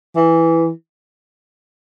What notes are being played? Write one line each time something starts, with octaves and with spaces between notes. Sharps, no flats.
E3